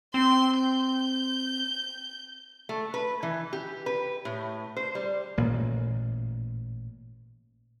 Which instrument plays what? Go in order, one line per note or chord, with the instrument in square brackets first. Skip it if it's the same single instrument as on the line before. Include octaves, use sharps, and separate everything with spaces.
[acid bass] C4 [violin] C6
[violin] G6
[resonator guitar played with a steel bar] A3
B4
E3
G4
B4
A2
C5
G3
[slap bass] A1 A#2 A#3